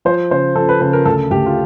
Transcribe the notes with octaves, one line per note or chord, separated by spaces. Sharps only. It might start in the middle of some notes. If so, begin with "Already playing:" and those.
F3 C5
C#3 C5
F3 A4
B4
C#3 B4
A#4
D2 A4
D2 G4
F4